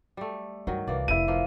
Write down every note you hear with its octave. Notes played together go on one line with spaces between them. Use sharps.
G3 A3
G2 D#3 F#3
C2 E3 A#3 D5
F1 D3 E4 D#7
F3 A#3